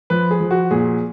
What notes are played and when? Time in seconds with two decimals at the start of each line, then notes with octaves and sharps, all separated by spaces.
0.10 F3 B4
0.31 G#4
0.40 F3
0.51 F#4
0.71 A#2 G#4